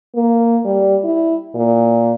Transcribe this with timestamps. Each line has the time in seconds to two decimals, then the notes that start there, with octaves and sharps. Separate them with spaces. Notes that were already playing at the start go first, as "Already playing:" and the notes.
0.15 A#3
0.65 G3
1.04 E4
1.55 A#2